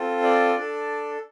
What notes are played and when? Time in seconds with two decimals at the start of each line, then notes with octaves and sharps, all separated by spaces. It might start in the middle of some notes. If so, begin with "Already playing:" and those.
Already playing: C4 F4 A4
0.23 D5
0.56 D4 A4